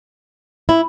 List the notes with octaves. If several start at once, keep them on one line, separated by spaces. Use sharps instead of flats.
E4